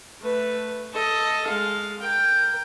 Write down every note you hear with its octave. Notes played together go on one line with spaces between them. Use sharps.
A3 B4
A4 D#5
G#3 F5
A#4 G5